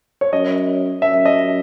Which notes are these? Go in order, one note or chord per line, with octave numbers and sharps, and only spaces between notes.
C#5
F#2 D#5
F#2 E5
D#5